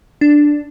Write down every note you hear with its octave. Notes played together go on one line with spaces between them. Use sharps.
D4